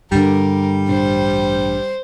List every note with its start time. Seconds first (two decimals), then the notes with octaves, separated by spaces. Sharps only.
0.12 G2 D3 G3 A#4
0.89 A1 A2 D4 C5